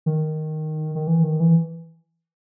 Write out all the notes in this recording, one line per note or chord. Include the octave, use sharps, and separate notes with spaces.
D#3
D#3
E3
D#3
E3